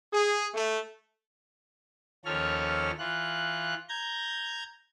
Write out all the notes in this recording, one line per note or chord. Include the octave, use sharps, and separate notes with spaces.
G#4
A3
D#2 F3 C#4 A4 C#5 F6
E3 F4 F#6
A#5 G6 G#6